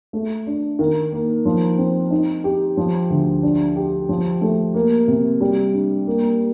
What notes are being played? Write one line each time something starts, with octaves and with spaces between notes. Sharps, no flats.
A3
D4
D#3
A#3
F3
C4
D#4
G4
F3
D2
D4
G4
F3
A3
A#3
C3
G3
D4
A#3